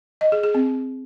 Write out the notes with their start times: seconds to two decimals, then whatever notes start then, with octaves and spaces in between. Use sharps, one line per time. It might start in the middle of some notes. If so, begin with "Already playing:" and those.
0.21 D#5
0.32 G#4
0.43 G#4
0.55 C4